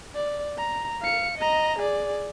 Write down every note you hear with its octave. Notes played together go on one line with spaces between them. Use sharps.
D5
A#5
F5 C#7
D#5 A#5
G#4 D5